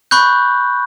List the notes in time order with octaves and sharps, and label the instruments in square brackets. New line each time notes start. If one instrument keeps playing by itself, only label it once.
[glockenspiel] B5 C#6 F#6 G6